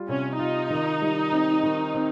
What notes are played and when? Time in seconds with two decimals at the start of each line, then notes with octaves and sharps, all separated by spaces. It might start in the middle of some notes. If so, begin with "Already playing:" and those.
Already playing: G3 F4
0.09 C3 C#4
0.39 D#4 F4
0.70 D#3
1.01 G3
1.33 C4
1.63 D#3
1.94 C4